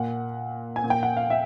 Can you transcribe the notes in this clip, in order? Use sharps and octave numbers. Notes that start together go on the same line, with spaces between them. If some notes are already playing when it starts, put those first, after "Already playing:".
Already playing: A#2 F#5
G#5
A#2
G5
F#5
F5
E5